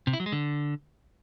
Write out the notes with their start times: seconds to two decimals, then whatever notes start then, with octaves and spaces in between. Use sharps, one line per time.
0.07 C3
0.13 E4
0.20 F#3
0.26 G#3
0.32 D3